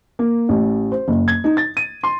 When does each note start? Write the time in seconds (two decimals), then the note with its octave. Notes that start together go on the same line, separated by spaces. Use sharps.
0.19 A#3
0.49 A1
0.92 C5
1.08 F#1
1.28 G#6
1.44 D#4
1.57 A6
1.77 D#7
2.03 C6